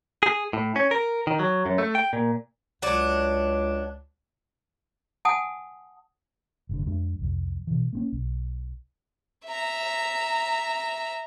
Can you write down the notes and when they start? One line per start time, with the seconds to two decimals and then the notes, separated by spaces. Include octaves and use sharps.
0.23 G#4
0.53 A2
0.76 C#4
0.91 A#4
1.27 D#3
1.39 F#3
1.66 F#2
1.78 A3
1.95 G5
2.13 A#2
2.82 C#2 F#3 D4
5.25 F#5 G#5 A5 D#6
6.69 F#1 G2 D3
6.86 F2 G#3 D4
7.20 C2 F2
7.67 B2 E3
7.93 A#3 C4 C#4
8.12 B1
9.45 E5 A#5